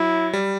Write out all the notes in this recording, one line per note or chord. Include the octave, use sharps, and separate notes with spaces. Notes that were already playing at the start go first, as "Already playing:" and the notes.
Already playing: F#3 E4
G3